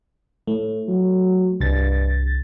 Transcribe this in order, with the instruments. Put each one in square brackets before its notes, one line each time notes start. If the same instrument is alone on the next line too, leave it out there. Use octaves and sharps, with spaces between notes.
[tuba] A2 [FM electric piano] A3
[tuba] F#3
[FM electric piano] C2 A6 [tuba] G2